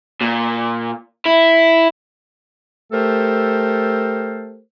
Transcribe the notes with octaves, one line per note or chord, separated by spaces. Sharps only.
A#2
E4
A3 G4 A4 A#4 C5